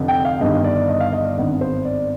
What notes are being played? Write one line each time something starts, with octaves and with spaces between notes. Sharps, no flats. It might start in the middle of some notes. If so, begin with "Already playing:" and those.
Already playing: F1 F2 D3
G5
F5
G1 G2 D#3 G3 D#5
D5
D#5
F5
D#5
D5
G#1 G2 D#3 B3
C5
D5